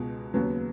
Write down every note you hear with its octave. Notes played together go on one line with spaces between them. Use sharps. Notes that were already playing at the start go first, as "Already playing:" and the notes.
Already playing: C#2 B2 G#3
D#2 C#3 F#3 B3